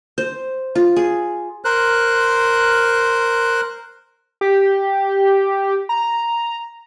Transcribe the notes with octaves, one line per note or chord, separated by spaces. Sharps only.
C5
F4
G#4
A#4 C5 F#6
G4
A#5